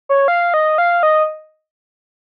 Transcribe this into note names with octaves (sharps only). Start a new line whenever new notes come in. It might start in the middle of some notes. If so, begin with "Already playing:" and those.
C#5
F5
D#5
F5
D#5